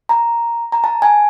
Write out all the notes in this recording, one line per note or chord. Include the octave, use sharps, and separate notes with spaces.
A#5
A#5
A5
G#5